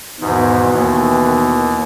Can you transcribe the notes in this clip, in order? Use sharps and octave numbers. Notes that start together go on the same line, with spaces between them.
E2 G#2 B2 D#3 E3
D#2